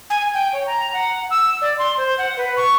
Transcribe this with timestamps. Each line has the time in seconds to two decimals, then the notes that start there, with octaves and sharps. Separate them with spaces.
0.10 G#5
0.34 G5
0.53 C#5
0.66 A#5
0.93 F#5
1.30 E6
1.61 D5
1.78 C6
1.97 C5
2.18 F#5
2.37 B4
2.57 C#6